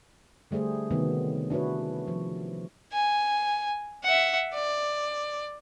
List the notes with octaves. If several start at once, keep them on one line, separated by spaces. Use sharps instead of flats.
D3 G3 A3 G#4 C5
C3 D#3 F#3 B3
D4 E4 F#4 B4 C#5
F3
G#5
E5 F#5
D5